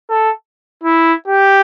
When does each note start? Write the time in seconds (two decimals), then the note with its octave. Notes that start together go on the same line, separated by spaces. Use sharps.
0.10 A4
0.83 E4
1.28 G4